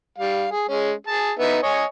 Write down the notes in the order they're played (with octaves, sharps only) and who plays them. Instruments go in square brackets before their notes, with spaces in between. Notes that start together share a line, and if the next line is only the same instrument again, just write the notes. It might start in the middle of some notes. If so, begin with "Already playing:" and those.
[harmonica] G3 F5
G#4
G#3 C#4
G#4 A5
B3 D#4 E5
C#5 D#5 G#5